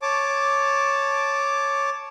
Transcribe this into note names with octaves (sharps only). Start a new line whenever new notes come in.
C#5 A5 D6